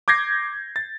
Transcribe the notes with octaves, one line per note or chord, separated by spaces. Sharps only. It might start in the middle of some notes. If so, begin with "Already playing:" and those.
D6 G6 G#6 A#6 C7
A6